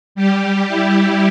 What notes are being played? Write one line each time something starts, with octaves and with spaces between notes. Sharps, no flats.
G3 G4
E4